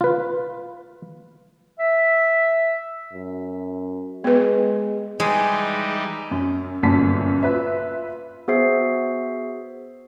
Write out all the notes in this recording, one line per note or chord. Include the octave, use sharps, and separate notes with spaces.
F4 B4
E5
F#2
G#3 B3 B4
E3 G3 G#3 D#4
F#2
G1 F#2 A#2 A5 B6
F4 B4 E5
B3 F#4 G#4 C5 E5 C7